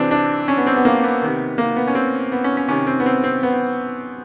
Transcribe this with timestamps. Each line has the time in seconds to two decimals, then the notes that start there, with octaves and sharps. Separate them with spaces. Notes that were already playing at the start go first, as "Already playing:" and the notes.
Already playing: C3 E3 C4 D4
0.11 D4
0.48 C#4
0.57 B3
0.67 C4
0.76 B3
0.85 A#3
1.04 B3
1.22 C3 D#3
1.58 A#3
1.76 B3
1.87 C#4
1.95 C4
2.32 B3
2.44 C#4
2.57 C#4
2.68 C3 D#3 C#4
2.87 C4
3.00 B3
3.06 C4
3.24 C4
3.43 B3